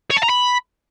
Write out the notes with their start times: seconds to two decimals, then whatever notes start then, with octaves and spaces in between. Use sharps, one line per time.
0.10 C#5
0.17 A5
0.23 A#5
0.29 B5